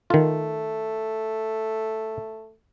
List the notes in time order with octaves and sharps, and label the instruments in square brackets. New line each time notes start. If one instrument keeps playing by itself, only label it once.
[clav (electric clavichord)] D#3 F4 [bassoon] A3